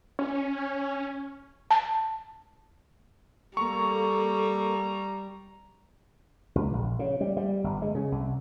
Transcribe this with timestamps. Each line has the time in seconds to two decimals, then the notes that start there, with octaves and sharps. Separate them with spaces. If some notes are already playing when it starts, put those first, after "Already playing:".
0.19 C#4
1.71 A5
3.57 G3 A#3 A4 A#5 C#6
6.55 C#2
6.73 A#1
6.99 C#3
7.21 G3
7.37 G3
7.64 G1
7.82 G#3
7.95 C#3
8.12 C2